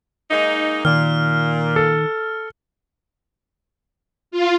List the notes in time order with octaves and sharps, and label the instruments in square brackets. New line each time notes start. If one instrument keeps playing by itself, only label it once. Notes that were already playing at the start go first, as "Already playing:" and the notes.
[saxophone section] G#3 A#3 D#4
[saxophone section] A#2 [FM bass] D#3 [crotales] F6
[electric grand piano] A4
[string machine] F4